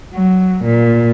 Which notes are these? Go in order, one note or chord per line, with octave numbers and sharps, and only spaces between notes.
F#3
A#2